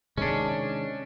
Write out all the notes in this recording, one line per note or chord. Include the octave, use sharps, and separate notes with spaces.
C3 D#3 G#3 C#4 D4